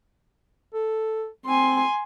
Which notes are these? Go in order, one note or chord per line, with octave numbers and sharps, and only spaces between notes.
A4
C4 G#5 C6